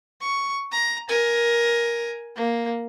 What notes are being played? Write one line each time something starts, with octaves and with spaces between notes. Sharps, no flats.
C#6
A#5
A#4 G#5
A#3